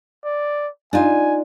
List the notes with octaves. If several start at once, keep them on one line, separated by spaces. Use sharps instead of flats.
D5
D4 D#4 F4 G#5